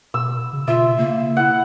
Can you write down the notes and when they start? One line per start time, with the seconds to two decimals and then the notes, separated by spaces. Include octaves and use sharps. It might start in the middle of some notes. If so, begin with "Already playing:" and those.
0.14 B2 E6
0.53 C#3
0.68 B2 F4 E5
0.98 C#3 A#3
1.37 E4 F#5